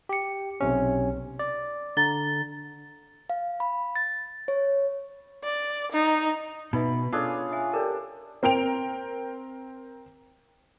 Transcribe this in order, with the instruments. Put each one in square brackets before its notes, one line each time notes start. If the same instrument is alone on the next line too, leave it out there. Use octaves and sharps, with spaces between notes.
[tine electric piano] G4 C#7
B1 C3 C#4
D5
[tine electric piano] D3 [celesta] A#5 A6 G7
[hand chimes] F5
B5
A6
C#5
[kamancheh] D5
D#4
[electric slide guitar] B2 [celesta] D#4 B4 E5 [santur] B5
[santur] C#4 D4 G#4 [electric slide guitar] F4 [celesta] A4 E6
[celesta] E5 G#5
[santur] G4 A4 [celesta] A#4 D5
[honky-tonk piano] C4 A#4 G5 D7 F7